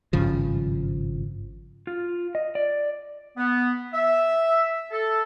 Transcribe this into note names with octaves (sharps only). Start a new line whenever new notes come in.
G#1 G2 C#3 F3
F4
D#5
D5
B3
E5
A4